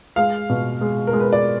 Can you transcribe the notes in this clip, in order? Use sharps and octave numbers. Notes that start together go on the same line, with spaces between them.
G#3 F5
B2
G#3
A#4
G#3
B4
D5